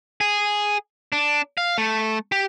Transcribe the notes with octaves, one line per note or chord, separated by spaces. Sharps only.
G#4
D4
F5
A3
G4